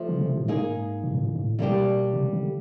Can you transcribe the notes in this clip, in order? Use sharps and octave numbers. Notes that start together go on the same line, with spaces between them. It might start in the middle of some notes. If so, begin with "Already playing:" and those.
Already playing: F3 A3 D4
C#3
C3
A2
G#2 A#3 D#4 G#4
A#2
A2
G#2
A2
B2 G3 A#3 D4 G4
C3
D3